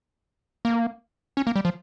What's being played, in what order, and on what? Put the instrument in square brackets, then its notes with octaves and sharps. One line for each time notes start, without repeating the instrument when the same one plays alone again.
[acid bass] A#3
C#4
A#3
G3
F3